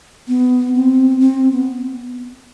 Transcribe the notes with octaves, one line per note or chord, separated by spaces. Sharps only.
B3
C4
C4
B3